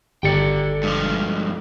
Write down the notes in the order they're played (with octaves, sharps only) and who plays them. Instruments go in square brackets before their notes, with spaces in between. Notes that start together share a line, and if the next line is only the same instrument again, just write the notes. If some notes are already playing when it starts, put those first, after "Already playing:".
[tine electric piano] G1 C#7 [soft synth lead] G4 [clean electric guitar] A4 D5 G5
[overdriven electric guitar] G2 F3 [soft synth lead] G#3